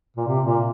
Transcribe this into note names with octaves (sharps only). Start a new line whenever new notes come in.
A#2
C3
A#2